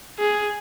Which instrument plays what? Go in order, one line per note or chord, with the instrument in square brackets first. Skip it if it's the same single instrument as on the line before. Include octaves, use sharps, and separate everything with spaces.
[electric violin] G#4